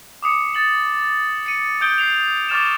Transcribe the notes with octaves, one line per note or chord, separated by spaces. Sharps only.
D6 D#6 C#7
A6 F#7
C#7 D#7
D#6 G6 D7 G7
C7 F7
C#6 D6 F6 A6 E7